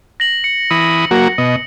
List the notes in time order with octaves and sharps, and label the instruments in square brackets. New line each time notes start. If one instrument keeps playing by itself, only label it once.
[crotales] A#6 F#7
C#7
[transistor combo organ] E3 B5 D#6
F#3 A#3 F#4
B2 D#5